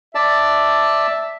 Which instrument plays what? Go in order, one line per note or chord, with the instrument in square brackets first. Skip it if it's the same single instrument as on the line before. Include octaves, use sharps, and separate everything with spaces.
[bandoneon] D5 A5 [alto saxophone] E5